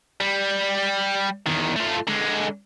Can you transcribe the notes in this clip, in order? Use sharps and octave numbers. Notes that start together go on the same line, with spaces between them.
G3
E2 D#3
A3 F4
D3 G#3